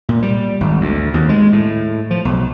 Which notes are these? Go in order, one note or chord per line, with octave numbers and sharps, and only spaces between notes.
A#2
G3
G#1
D2
D#2
G#3
A2
F3
B1